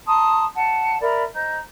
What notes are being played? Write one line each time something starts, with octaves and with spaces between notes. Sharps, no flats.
A5 A#5 C6 D#6
F#5 A5
A#4 D5 E5 B5
C5 D#5 A#5 G6